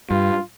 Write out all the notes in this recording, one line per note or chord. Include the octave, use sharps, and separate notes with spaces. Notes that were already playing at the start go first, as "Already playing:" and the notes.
G2 F4